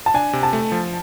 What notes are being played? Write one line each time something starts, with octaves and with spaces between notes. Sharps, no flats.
A5
D4 G#5
C3
A5
A3
F3